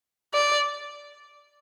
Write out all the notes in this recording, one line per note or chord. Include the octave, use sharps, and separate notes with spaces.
D5